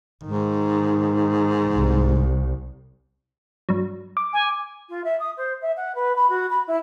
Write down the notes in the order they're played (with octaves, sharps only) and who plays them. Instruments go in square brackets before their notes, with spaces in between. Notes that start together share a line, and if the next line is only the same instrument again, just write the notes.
[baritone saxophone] G#2 [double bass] D#3
[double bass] C2
[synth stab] G2 F#3
[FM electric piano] D6
[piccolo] G#5
[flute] F4
E5
D#6
C5
E5
F#5
B4
B5
F#4
B5
E4